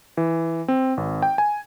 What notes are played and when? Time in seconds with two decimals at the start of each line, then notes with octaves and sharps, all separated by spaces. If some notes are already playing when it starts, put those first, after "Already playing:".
0.17 E3
0.68 C4
0.97 G#1
1.22 G5
1.38 G#5